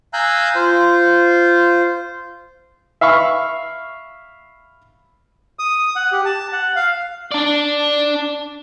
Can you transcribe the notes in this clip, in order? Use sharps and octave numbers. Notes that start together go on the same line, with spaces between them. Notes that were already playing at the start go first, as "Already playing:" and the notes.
F5 G#5 A#5 E6 F#6 G6
F4 C5
E5 F5 B5 C#6
D#6
F#5
G4
A5
F#5
F5
D4 D5